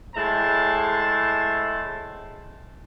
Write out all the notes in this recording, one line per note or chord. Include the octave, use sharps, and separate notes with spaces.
A2 G#3 E4 C5 A5